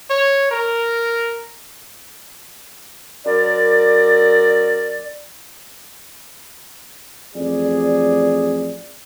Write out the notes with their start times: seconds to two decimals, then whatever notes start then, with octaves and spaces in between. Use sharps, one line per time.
0.10 C#5
0.51 A#4
3.26 F#2 A#4 D5
7.35 A1 F2 G#4 D5